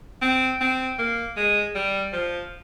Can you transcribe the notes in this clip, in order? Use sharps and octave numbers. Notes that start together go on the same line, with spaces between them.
C4
C4
A#3
G#3
G3
F3